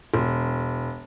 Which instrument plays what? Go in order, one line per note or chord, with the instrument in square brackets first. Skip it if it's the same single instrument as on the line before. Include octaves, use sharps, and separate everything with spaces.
[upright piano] E1